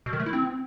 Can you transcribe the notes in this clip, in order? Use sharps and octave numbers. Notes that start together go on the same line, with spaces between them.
B2
D#3
A3
E4
C4